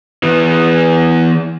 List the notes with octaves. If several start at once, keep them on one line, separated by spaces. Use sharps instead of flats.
E3 B3